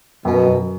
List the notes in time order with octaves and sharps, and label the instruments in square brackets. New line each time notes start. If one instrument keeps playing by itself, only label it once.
[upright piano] F#2 [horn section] B2
[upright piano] F#2